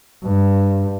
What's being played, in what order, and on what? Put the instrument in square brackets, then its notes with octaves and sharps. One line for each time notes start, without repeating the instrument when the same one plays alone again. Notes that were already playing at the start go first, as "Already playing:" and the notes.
[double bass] G2